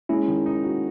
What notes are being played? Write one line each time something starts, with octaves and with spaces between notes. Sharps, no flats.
G#3 C#4 E4
D#3
D#4
F#4